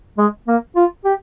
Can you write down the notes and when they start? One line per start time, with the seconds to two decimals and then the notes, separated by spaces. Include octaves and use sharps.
0.18 G#3
0.48 A#3
0.76 F4
1.05 G4